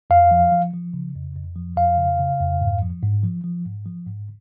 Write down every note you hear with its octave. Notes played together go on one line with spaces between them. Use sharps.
F2 F5
F3
F3
F3
C#3
F2
F2
F3
F2 F5
C#3
C#3
F2
G#2
F3
G#2
F3
F3
G#2
F3
G#2